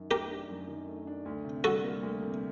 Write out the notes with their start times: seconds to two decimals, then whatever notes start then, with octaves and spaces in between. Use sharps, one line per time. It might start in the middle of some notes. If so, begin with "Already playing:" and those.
Already playing: F#2 D#3
0.10 A3 G4 A#4
0.30 D4
0.50 F#2
0.68 D#3
0.88 A3
1.07 D4
1.25 D2
1.44 C3
1.64 G3 F#4 A4
1.84 A#3
2.03 D2
2.22 C3